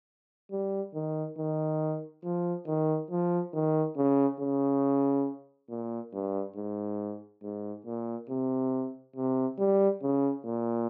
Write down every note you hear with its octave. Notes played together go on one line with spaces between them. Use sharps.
G3
D#3
D#3
F3
D#3
F3
D#3
C#3
C#3
A#2
G2
G#2
G#2
A#2
C3
C3
G3
C#3
A#2